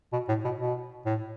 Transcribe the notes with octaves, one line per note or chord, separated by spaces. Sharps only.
B2
A2
B2
B2
A2